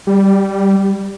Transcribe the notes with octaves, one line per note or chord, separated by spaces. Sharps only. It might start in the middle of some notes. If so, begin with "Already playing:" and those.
G3